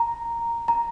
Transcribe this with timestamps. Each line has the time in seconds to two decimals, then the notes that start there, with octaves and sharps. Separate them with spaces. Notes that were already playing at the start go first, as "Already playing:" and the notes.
Already playing: A#5
0.68 A#5